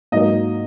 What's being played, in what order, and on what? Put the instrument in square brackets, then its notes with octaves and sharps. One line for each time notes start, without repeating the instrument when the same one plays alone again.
[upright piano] G#2 F#3 A#3 D#5